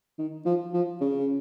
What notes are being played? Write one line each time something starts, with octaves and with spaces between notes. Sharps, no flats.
D#3
F3
F3
C#3